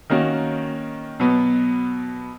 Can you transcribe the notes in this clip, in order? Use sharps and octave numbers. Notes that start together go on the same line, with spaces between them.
D#3 A#3 C#4 F#4
B2 F#3 B3